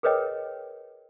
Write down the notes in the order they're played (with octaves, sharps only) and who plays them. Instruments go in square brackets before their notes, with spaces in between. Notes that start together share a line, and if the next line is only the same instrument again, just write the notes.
[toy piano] G#4 A#4 B4 C#5 D#5 G5